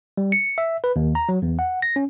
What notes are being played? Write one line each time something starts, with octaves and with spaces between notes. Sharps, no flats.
G3
C#7
E5
B4
D#2
A#5
F#3
E2
F#5
A#6
C#4